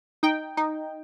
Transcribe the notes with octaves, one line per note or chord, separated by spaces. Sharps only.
D#4 G5
D#4